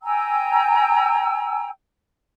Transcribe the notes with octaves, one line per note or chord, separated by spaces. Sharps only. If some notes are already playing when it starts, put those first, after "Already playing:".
G5 G#5 A#5 E6